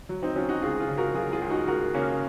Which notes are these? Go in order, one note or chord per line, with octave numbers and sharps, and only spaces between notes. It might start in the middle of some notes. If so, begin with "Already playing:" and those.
F#3
C4 D#4
F#3 C#4 F4
D#4 F#4
C#2 F4 G#4
F4 G#4
C#3
F#4 A#4
F#3 F4 G#4
F4 G#4
C#2
D#4 F#4
C#2 F#4 A#4
C#3 A#3 C#4